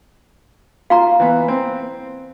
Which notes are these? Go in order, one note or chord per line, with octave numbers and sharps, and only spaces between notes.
F4 F5 A#5 C6
E3 B3
C4